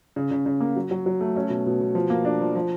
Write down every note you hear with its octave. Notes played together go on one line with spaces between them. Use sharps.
C#3
C#3
C#3
A#3
F#3
F#3
F#3
A3
C#4
B2
B2
B2
F3
A#3
D4
F3
F3